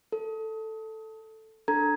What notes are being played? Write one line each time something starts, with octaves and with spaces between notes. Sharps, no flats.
A4
D4 A4 A#5 G#6